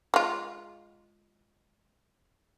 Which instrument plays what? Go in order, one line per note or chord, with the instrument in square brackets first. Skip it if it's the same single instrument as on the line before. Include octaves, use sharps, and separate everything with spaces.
[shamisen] G#3 F4